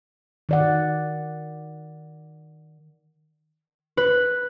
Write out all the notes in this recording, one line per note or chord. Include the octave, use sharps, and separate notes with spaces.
D#3 D5 F#5
B4